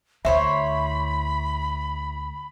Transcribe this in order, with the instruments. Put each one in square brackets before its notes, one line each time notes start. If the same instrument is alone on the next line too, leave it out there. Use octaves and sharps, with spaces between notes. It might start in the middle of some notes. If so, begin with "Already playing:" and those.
[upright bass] D2 [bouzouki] E4 C5 C#5 [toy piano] E5 [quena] B5